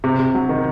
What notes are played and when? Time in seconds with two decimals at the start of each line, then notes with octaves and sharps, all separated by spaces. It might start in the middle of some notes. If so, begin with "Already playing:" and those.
0.04 C3
0.19 C3
0.35 F#3
0.49 D#3